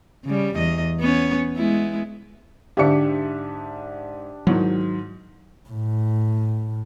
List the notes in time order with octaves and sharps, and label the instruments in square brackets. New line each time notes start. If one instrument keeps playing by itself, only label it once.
[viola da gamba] C#3 G3
E2 D#5
B3 C#4 C#5
G#3 B3 E4
[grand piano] G#2 E5 C#7 [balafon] D3 F5 [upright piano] D4 G4
[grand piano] G#2 D#3 [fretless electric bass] F#3 [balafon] E4
[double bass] A2